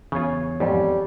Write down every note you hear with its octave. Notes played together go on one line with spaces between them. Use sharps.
E2 C#3 F4 C#5
F2 G#2 G3